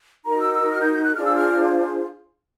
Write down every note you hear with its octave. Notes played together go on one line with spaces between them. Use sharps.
D#4 F#4 A#4 A#5
E6
E6
F6
G6
G6
F#6
D4 F4 G#4 C5 F6
E6
F6